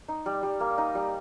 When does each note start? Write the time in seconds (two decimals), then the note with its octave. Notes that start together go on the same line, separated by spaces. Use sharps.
0.08 D#4
0.26 G3
0.43 G3
0.60 A#3
0.78 D#4
0.95 G3